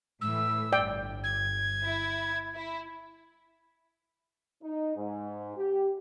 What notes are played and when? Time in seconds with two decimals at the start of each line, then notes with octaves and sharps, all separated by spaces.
0.21 A2 E3 E6
0.72 G1 D5 G5
1.24 G#6
1.84 E4
2.55 E4
4.62 D#4
4.96 G#2
5.56 G4